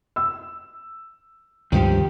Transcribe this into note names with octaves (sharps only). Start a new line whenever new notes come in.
E6
C#2 G2 D#3 F3 G4